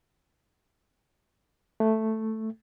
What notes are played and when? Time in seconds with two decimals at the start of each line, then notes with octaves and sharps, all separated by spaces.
1.80 A3